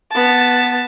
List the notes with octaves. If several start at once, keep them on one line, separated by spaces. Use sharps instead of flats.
B3 A5